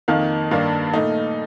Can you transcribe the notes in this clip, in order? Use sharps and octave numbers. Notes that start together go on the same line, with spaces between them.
F2 D#3 A#3 D#4 F5
G2 D#3 A#3 D4 F5
A#2 A3 D#4